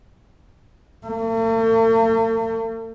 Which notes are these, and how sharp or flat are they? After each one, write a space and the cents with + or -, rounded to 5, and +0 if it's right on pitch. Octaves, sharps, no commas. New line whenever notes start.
A3 +45